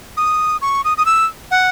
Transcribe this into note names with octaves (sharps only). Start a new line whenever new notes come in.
D#6
C#6
D#6
D#6
E6
F#5